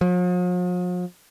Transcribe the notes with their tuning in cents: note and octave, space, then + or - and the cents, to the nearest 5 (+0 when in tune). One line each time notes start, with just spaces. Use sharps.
F3 +45